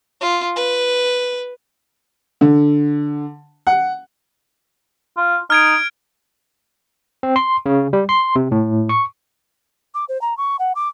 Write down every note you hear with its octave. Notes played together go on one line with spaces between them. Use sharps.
F4
B4
D3
F#5
F4
D#4 F6 G#6 D7
C4
C6
C#3
G3
C6
C3
A2
C#6
D6
C5
A#5
C#6
F#5
D6